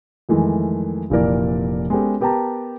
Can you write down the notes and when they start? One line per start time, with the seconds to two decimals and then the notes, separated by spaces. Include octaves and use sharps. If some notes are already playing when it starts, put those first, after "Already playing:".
0.29 F2 D#3 E3 G#3 A3
1.10 F1 A#2 E3 A#4 D5
1.90 G#3 B3 C#4 G4 A4
2.21 B3 G4 A#4 G5 A5 A#5